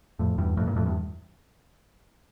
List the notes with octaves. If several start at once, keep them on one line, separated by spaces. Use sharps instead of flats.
F2 A2
E2 G2
F2 A2
G2 A#2
F2 A2
E2 G2